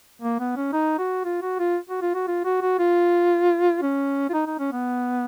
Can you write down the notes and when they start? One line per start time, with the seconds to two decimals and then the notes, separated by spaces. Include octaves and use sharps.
0.21 A#3
0.39 B3
0.56 C#4
0.73 D#4
0.99 F#4
1.25 F4
1.42 F#4
1.59 F4
1.89 F#4
2.02 F4
2.15 F#4
2.27 F4
2.45 F#4
2.61 F#4
2.79 F4
3.82 C#4
4.29 F4
4.33 D#4
4.47 D#4
4.59 C#4
4.72 B3